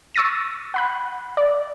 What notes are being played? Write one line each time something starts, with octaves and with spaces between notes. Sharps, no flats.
C#6 E6 A6 A#6 D#7
F#5 B5 F#6
D5